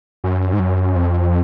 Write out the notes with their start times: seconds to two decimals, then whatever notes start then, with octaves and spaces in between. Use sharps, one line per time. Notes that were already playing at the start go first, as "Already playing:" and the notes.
0.24 F#2
0.53 G#2
0.59 F#2
0.96 F2